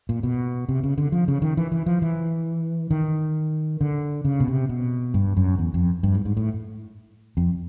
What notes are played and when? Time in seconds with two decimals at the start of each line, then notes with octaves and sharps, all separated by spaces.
0.09 A#2
0.23 B2
0.69 C3
0.83 C#3
0.98 D3
1.12 F3
1.28 C#3
1.42 D#3
1.57 E3
1.72 E3
1.86 F3
2.02 E3
2.91 D#3
3.81 D3
4.25 C#3
4.40 B2
4.48 C3
4.69 B2
5.14 G2
5.37 F#2
5.59 E2
5.74 F2
6.03 G2
6.15 G#2
6.25 G#2
6.37 A2
7.37 F2